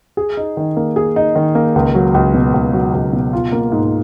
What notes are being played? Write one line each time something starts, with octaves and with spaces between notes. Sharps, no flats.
G#4
D#4
D#3
A#3
G#4
D#4
D#3
A#3
C#2
F#3
C#2
B2
C#2
F#3
C#2
B2
F4
A#3
G#2